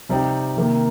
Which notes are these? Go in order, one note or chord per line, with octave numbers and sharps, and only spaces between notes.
C3 G3 C4 D#4 G4
C3 D#3 A#3